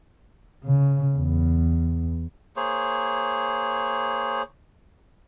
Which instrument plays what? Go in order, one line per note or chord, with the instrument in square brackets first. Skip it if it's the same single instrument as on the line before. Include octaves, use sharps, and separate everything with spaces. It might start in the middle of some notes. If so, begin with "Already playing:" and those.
[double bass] C#3
E2
[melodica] A#3 G#4 C5 C#5